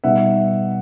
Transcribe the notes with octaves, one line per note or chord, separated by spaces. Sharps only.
B2 G3 B3 D#4 E5 F#5